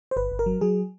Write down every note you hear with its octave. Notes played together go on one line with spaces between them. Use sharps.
C5
G1 B4
G1
A#4
F#3
F#3 G#4